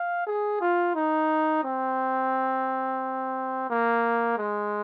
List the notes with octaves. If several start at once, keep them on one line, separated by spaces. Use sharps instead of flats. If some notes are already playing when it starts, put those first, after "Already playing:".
Already playing: F5
G#4
F4
D#4
C4
A#3
G#3